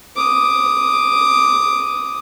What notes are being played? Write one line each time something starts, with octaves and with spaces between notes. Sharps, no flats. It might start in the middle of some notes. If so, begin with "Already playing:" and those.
D6 D#6